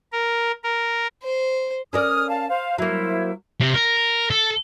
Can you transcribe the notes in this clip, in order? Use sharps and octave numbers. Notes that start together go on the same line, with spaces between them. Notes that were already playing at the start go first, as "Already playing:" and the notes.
A#4
A#4
C5
C#4 A#4 D5 D#6 F6
F5 A5
C5 F5
F#3 A#3 E4 C5
C3
A#4
A4